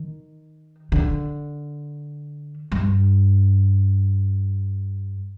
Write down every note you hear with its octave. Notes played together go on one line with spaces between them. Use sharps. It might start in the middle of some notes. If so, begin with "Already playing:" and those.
Already playing: D#3
D3
G2